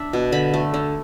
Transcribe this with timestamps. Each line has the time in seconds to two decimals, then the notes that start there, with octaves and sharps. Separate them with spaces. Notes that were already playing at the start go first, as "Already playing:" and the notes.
Already playing: D4 E5
0.13 B2
0.32 D3 B5
0.54 A3
0.74 D3